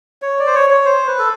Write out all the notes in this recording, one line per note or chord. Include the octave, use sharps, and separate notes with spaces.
C#5
D5
C5
C#5
C#5
C5
B4
A4